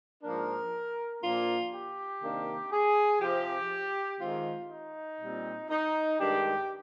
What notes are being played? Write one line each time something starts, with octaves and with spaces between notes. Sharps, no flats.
G#2 F3 A#3 D4 A#4
A#2 F3 A#3 D4 F4
G4
C3 D#3 A#3 D4
G#4
C3 F3 C4 G4
D#3 G#3 C4 F4
D#4
A#2 G3 C4
D#4
G2 D#3 G#3 D4 G4